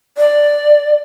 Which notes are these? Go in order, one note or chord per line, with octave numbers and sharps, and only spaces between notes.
D5